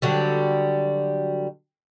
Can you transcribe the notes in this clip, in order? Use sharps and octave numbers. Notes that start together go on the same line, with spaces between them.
D3 F#3 G3